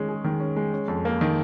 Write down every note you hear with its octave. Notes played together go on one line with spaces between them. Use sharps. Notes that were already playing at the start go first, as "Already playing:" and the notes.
Already playing: D#3 G#3 C#4
G#4
D#3
C#4
G#3
C#4
F2
A#3
D#3